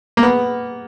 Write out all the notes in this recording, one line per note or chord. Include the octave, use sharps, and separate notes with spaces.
A#3
B3